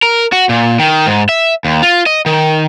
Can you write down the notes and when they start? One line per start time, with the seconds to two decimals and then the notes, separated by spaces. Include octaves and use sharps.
0.02 A#4
0.32 F#4
0.49 A#2
0.79 D#3
1.06 G#2
1.29 E5
1.65 D#2
1.83 F4
2.06 D#5
2.26 D#3